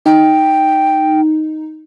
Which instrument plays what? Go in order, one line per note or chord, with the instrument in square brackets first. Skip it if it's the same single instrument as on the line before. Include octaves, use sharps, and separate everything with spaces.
[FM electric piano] D#4 [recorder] G5